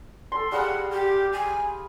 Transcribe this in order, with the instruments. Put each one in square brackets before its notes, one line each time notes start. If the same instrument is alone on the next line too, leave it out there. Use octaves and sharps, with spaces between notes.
[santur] A4 C6
[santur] G3 G#4 F5 [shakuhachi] F#5
[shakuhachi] G4
G#5